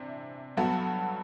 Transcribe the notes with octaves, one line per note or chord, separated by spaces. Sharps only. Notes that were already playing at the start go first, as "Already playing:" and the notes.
Already playing: C3 E3 D4
G2 F#3 B3 F#4 A4